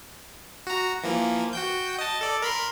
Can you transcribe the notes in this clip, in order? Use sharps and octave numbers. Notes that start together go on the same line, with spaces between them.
F#4 A#5
E3 F3 A#3
F#4 G5 G6
D#5 A5
A4 D5
A#4 B5 C6